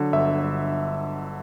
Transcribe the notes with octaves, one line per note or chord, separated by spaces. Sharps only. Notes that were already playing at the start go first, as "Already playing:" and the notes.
Already playing: D3 F#3
G1 E5
G1